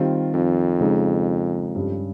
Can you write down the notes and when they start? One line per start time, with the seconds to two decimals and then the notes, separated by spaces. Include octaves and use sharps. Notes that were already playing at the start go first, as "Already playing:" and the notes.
Already playing: D#3 G3 C4 F4
0.34 F2
0.80 C#3 G#3 D#4
1.75 G2 G3 C#4